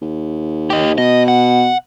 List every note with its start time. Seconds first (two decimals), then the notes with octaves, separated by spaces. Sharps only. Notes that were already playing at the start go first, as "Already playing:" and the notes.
0.02 D#2
0.70 G4 D#5
0.98 B2 D#5
1.28 F#5